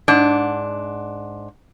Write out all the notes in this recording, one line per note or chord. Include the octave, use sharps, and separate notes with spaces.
G#2 D4